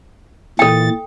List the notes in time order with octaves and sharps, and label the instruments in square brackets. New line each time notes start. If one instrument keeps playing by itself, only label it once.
[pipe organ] A#2 E3 A6 [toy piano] A4 G5